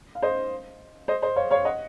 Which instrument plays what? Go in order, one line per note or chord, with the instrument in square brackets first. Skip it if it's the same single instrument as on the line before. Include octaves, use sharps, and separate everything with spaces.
[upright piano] F5
C5 D#5
C5 D#5
C5 D#5
C#5 F5
C#5 F5
D#5 F#5